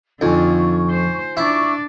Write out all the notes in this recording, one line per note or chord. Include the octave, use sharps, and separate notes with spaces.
F2 D3 D#4 F4 G#5 C#6
C5
D4 E4 D5 C#6 D6